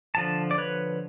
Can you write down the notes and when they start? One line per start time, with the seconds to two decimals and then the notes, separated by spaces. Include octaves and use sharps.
0.15 D3 F3 A5
0.51 D5
0.58 B4 C#5